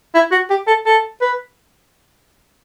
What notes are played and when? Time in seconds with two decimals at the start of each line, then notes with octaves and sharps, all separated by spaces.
0.15 E4
0.31 F#4
0.50 G4
0.67 A4
0.86 A4
1.21 B4